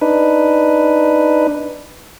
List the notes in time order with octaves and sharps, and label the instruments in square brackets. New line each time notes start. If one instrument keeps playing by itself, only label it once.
[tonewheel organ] D4 D#4 B4